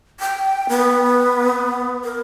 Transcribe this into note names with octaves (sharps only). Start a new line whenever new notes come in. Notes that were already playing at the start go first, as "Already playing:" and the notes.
G5
B3
A#4